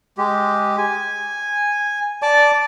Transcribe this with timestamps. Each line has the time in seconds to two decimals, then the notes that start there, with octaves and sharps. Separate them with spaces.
0.18 G#3 G4
0.78 G#5
2.22 D5 A5 D6